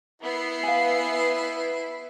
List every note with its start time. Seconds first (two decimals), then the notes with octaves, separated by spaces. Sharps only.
0.22 B3 E4 C7
0.63 B4 F5 G#5